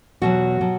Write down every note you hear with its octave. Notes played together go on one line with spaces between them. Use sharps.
E2 B2 F#3 F#4
B2 F#3